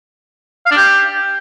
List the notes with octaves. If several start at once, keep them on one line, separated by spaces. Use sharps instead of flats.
F5
D4
G4